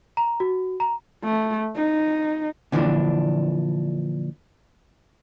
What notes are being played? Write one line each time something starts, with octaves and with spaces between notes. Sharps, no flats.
A#5
F#4
A#5
A3
D#4
A#2 D3 E3 F3 D4